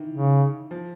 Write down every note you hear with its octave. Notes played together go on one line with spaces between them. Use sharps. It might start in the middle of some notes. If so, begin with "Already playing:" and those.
Already playing: D#3 E3
C#3
F3